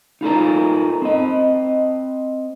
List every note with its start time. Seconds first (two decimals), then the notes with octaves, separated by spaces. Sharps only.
0.21 D#4 F4 A4 A#4
1.02 C4 D#5